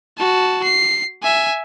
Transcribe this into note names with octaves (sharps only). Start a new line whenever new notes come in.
F#4 A5
C7
E5 G#5